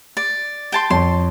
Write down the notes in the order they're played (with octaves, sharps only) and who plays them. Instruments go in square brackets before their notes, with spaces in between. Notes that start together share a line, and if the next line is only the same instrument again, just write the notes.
[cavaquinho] D5
G5 A5 C6
[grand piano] F2 C#5 A5 [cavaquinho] C6